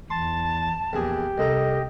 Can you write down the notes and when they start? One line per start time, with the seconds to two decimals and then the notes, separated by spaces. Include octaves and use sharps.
0.10 E2 A5 C6 A6
0.93 A#1 E2 G4 G#4
1.38 C2 A4 D#5 A#5